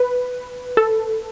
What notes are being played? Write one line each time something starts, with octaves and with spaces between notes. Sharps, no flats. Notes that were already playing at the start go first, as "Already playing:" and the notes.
Already playing: B4
A4